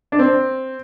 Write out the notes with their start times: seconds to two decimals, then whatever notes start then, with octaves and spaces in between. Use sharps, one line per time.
0.12 D4
0.19 C4